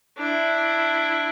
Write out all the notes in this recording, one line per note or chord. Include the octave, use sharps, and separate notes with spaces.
D4 E4